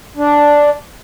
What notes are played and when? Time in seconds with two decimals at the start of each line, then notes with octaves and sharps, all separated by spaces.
0.17 D4